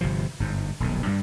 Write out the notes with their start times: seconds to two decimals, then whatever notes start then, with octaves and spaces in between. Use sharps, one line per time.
0.01 G1 C3 F3
0.40 G1 G#2
0.80 D#1 B1 D#3
1.06 G2 G3